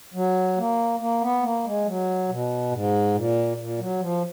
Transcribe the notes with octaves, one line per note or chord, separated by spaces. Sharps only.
F#3
A#3
A#3
B3
A#3
G#3
F#3
B2
G#2
A#2
A#2
F#3
F3